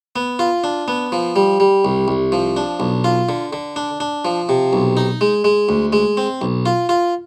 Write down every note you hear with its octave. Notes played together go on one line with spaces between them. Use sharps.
B3
F4
D4
B3
F3
G3
G3
C2
C2
F3
D4
B1
F4
D3
D3
D4
D4
F3
C3
B1
D#4
G#3
G#3
D2
G#3
C4
B1
F4
F4